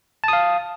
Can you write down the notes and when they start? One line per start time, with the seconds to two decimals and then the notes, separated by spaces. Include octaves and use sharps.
0.24 A5
0.28 D#6
0.33 F5